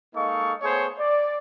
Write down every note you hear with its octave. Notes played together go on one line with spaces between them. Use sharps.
G#3 A#3 D#4 A4 F5 C#6
A3 B3 G#4 C5 C#5
D5